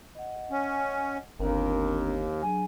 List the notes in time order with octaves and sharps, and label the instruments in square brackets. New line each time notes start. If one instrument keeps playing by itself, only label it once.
[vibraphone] D#5 F#5
[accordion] C#4
[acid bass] G1 [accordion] D#2 [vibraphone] C4 D4 A#5 [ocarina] A#4
[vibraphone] F#3 D4 G#4 [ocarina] G#5